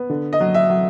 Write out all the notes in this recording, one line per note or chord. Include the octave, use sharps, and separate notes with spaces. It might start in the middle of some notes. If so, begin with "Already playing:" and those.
Already playing: B3
D3
D#5
F#3
E5
F#3